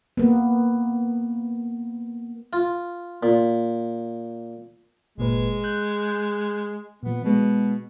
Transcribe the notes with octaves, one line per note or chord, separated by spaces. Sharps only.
A#3 B3
F4
A#2
G1 A#2 G#3 B4
F#6 G6
A#2 F3 B3
B2 G#3 B3